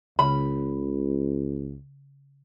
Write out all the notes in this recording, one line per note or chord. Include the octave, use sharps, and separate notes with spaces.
C#2 C#3 B5